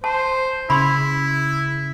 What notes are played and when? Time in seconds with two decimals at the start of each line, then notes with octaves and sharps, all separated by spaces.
0.04 C5 A5
0.70 C#3 E4 B5 C6